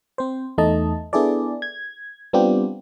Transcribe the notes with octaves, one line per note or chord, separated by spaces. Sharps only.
C4 C5
E2 A3 D#4 D#5 A5
B3 D4 E4 G#4 A4 D5
G#6
G3 B3 C4 D4 F4 G4